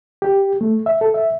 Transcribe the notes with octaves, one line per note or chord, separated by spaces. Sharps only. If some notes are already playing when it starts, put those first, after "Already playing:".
G4
A3
E5
A4
E5